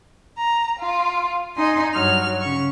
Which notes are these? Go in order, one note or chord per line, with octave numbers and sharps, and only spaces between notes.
A#5
F4
D#4 D#5 G#5 C6
G2 F#3 F6
C#3 C#6